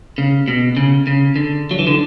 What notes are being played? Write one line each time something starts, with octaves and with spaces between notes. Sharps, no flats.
C#3
B2
C#3
C#3
D3
F#3
E3
D3